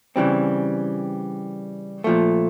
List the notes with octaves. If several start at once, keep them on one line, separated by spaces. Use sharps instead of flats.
C#3 E3 G3 C4
A#2 F3 A3